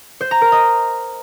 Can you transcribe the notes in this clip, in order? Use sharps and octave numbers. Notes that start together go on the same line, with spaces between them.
C5
A#5
A#4
D#5